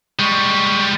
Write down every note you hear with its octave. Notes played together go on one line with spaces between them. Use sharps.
G3 G#3 C#6